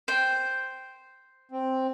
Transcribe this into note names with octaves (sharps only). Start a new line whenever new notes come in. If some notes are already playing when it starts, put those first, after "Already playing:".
C5 G5
C4